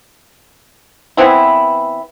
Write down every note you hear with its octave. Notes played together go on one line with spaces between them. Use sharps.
E3 B3 C4 E4